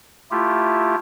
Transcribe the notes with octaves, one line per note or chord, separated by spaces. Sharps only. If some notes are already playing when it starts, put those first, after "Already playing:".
A3 E4 F4 G4